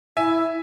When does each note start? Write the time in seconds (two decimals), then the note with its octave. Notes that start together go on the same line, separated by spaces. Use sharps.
0.17 E4 E5 G#5